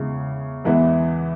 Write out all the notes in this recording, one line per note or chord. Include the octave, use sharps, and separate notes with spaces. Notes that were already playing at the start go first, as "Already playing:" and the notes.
Already playing: E2 C#3 G#3 E4
E2 E3 G#3 B3 E4